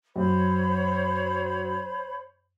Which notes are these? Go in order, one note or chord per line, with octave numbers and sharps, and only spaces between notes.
F#2 C5 C#5 B5